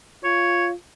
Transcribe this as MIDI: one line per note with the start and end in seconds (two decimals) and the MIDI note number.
0.24 0.74 65
0.24 0.67 73